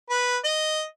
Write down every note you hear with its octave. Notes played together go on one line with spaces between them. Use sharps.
B4
D#5